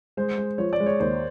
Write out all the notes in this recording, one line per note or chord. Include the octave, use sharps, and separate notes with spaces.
G#3 C5
G#3
F3 C#5
D5
G#3
C#5
D#2 C5